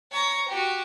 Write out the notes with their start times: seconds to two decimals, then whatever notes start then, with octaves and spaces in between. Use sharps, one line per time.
0.12 C#5 A#5
0.49 F#4 G4